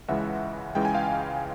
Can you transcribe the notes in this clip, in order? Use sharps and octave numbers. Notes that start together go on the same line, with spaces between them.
C#2 C#3 E3 G#3 E5 F#5
C#2 C#3 E3 G#3 G5
G#5
F5 G5